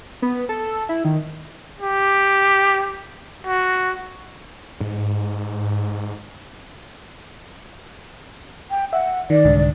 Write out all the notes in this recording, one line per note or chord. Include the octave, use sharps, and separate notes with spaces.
B3
A4
E4
D#3
G4
F#4
G#2
G5
E5 F#5
D#3 D5
C2 G#2 D3